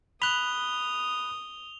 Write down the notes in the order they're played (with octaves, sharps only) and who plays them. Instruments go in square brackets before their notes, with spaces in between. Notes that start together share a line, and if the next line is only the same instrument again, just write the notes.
[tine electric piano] B5 F#6 [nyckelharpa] D#6 [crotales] F7 G7